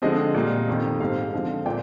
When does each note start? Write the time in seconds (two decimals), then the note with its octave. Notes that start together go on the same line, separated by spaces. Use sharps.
0.02 D3 F3 G#3 C4 D#5
0.34 A#2 G3 A#3
0.67 F2 C3 D#3
1.00 G#2 G3 C4 F5
1.33 D3 F3 G#3 C4
1.66 A#2 G5